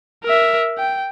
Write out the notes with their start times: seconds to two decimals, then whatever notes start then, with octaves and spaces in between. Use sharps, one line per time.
0.24 A#4 E5
0.78 G5